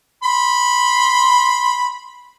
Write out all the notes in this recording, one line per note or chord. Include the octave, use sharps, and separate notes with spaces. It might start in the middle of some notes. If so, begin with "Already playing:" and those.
B5 C6